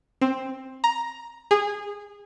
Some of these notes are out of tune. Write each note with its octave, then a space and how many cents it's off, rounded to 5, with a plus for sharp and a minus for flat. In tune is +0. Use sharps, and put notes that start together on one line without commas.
C4 +10
A#5 +10
G#4 -20